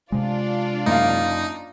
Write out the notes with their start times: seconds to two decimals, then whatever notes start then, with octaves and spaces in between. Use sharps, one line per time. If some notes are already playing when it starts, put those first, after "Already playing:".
0.12 C3 G#3 D4 F4 D5
0.86 F#1 D#4 F5